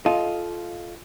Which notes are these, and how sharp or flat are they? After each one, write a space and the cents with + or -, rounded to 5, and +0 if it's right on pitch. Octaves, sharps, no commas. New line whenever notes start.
F4 +0 A4 -25 D#5 +5